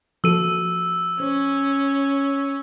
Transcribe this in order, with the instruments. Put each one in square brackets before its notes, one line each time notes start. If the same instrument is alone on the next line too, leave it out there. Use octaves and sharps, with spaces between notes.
[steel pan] F3 F#4 A4 [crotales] E6 D#7
[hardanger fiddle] C#4 [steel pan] C5